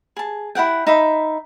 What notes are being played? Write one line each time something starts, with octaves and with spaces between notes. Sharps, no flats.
G#4 A5
E4 G#4 F#5 G5
D#4 E5 B5